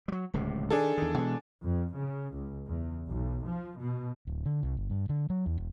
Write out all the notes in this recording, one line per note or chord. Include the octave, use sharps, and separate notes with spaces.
F#3 G3
D1 C#2 C3
D#3 D4 G#4 A4
E2 D#3
B2 E3 G#3
F2
C#3
C#2
E2
B1
F3
B2
D1
D3
C2
G1
G2
D3
F#3
E2
E1